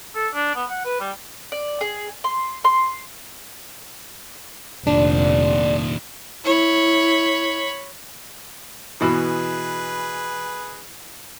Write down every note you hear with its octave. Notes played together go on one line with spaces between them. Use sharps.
A4
D4
B3
F#5
B4
G3
D5
G#4
C6
C6
F1 A#2 D#3 D4 D5
E4 C#5 B5
B2 E3 G#4 B4